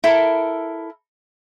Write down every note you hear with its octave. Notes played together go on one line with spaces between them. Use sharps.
E4 A4 A#4